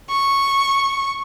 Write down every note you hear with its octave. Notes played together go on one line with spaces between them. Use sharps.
C#6